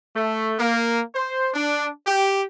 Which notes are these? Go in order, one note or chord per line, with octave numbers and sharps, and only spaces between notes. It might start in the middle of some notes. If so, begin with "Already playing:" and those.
A3
A#3
C5
D4
G4